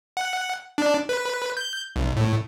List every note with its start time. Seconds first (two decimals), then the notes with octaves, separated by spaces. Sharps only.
0.17 F#5
0.78 D4
1.09 B4
1.57 G6
1.96 B1
2.16 A2